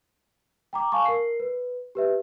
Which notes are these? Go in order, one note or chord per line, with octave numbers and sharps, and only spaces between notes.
G5 A#5 D6
F5 G#5 A5 C#6
A#4 C7
B4
G4 B4 E5